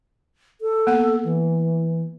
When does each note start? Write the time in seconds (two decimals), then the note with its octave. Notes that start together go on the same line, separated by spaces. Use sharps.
0.61 A4
0.87 A#3 B3 F#5
1.24 E3